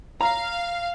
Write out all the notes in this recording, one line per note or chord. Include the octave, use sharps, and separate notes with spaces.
F5 A#5